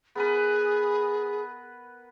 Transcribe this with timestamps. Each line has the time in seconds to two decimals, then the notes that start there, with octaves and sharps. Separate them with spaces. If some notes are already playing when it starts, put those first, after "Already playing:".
0.15 B3 G#4 A#4 B4